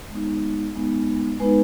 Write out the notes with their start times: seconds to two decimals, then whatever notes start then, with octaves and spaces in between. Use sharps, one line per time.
0.10 G#3 B3 D#4
0.75 G#3 B3 D#4
1.40 G#3 B3 D#4 B4